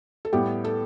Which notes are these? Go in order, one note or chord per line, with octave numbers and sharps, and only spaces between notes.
A4
A2 G3 B3 G4
A4